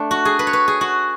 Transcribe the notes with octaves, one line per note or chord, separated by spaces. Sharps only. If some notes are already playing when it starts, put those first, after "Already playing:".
Already playing: A3 D4
F#4
G#4
B4
C#5
B4
G#4
F#4